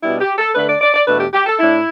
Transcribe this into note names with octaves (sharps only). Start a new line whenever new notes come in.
B2 G3 B3 D4 E4
G4
A4
D3 A3 D4 B4
D5
D5
D5
E2 B2 A3 D4 B4
G4
G4
A4
A2 A3 D4 E4